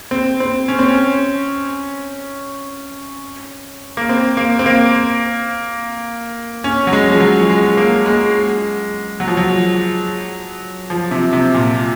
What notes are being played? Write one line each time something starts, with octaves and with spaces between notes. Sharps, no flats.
C4
C4
C#4
C4
C#4
A#3
C4
A#3
C4
A#3
C#4
F#3
G#3
F3
F#3
G#3
A#3
G#3
F#3
F3
F#3
F3
C3
C3
A#2